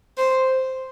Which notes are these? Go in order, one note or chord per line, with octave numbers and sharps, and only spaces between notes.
C5